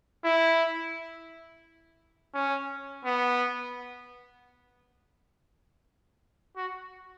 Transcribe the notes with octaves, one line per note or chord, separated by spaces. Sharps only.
E4
C#4
B3
F#4